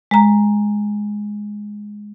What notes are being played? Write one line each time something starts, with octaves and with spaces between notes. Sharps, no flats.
G#3 A#5